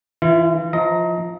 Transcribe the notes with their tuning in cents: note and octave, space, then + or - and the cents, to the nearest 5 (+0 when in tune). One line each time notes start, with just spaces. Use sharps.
E3 +0 F4 -35
F3 +0 D#5 +40 A#5 +0